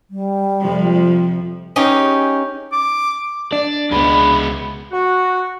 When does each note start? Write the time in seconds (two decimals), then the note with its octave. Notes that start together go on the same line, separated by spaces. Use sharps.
0.10 G3
0.60 F2 C3 F3
1.76 C#4 D#4 G4 G#4
2.72 D6
3.52 D4 D5
3.92 C#2 B2 G#3 B3 B5
4.92 F#4